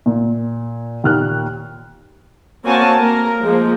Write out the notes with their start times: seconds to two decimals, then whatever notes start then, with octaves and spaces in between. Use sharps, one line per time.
0.06 A#2
1.04 D#2 A#2 F6 F#6
2.64 A#3 C4 F#4 C#5 G#5 A5
2.97 A#3 A#4
3.43 F3 G#3 A#3